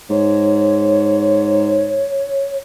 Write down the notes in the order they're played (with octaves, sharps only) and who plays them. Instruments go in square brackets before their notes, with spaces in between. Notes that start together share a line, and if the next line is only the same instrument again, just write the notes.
[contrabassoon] G#2 [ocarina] C#5